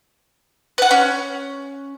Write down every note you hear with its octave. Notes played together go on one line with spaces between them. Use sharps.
B4 F#5
C#4